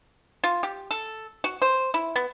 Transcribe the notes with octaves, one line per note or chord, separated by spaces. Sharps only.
F4
G4
A4
F#4
C5
E4
B3